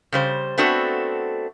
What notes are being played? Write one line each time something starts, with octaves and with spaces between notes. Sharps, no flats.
C#3 G3 C5
A3 B3 C4 D4 F#4 A4